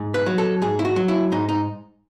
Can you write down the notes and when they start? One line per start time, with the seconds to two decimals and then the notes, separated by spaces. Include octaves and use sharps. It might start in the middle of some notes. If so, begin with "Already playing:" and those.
Already playing: G#2
0.14 B4
0.26 F#3
0.38 A4
0.62 G#2 G#4
0.79 E4
0.85 F#4
0.96 F#3
1.08 E4
1.32 G#2 D#4
1.49 D#4